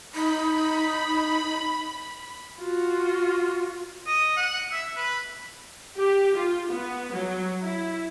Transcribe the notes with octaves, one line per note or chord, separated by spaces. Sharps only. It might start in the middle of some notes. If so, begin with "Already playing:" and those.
D#4 B5
F4 F#4
D#5
F#5
E5
B4
G4
F4
B3
F#3
E4